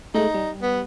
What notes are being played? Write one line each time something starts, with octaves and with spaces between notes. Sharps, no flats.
G#3 A3 D#4
G3
B3